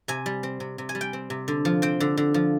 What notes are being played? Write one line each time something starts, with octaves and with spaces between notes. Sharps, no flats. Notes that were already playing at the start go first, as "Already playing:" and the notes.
C3 G#5
G3
C4
C3
C3
G#5
G3
G5
C4
C3
D3
F3
C4 G5
D3
D3
F3